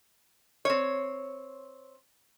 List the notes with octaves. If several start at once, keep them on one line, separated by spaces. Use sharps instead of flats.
C4 C#5